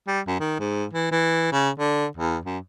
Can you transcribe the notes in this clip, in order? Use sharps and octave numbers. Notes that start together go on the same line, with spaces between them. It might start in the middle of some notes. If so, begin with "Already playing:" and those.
G3
F#2
D#3
G#2
E3
E3
C#3
D3
E2
F#2